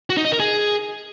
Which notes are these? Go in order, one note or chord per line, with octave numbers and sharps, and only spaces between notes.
F#4
D#4
D#5
A#4
G#4